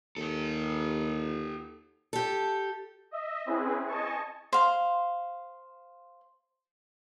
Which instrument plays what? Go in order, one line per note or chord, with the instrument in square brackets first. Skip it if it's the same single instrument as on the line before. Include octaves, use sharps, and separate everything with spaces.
[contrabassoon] D#2 [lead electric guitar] G4 A4
[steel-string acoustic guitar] G4 A4
[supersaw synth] D#5 E5
C4 C#4 E4 G#4 B4
D#5 G#5 A5 C#6
[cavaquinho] C5 F5